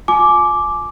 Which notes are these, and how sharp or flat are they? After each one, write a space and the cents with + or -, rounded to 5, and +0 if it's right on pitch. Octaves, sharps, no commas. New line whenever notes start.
F4 +25 G#5 +35 D6 +0